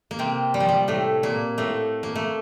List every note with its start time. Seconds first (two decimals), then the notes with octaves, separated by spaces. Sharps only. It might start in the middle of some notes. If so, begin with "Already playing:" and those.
0.11 A#3
0.19 C3 C4
0.54 G3
0.60 F3
0.69 G3
0.88 A2 A3
1.23 A#2 A#3
1.58 A2 A3
2.03 A#3
2.15 A3